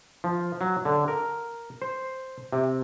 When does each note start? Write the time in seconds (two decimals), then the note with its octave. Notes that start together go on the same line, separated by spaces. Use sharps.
0.24 F3
0.61 F#3
0.85 D3
1.08 A#4
1.82 C5
2.53 C3